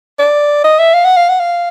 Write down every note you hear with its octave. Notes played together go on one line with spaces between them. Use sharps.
D5
D#5
E5
F5
F#5
F5
F#5
F5